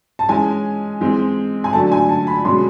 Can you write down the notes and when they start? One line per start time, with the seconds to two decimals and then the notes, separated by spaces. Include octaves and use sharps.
0.19 A5
0.28 E3 G#3 C#4 G#5
1.00 E3 G#3 C4
1.64 G#5
1.73 D3 F#3 A3 A5
1.92 G#5
2.09 A5
2.27 B5
2.45 B2 G#3 C#4 C6